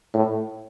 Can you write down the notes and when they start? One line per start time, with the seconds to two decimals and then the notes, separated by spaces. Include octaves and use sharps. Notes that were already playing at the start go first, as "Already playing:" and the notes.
0.14 A2